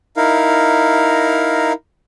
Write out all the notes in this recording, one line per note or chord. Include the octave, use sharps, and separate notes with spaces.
D#4 E4 A#4 F5